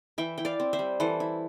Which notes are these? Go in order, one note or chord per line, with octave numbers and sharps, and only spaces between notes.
E3 E5 G5
E4 G5
D5 F5
C4
C5 E5
G3
E3 A4 C5
E4